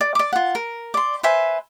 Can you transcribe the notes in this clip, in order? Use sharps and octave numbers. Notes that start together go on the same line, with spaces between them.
D5
D5 D6
F4 F#5
A#4
D5 C6
B4 C5 E5 G#5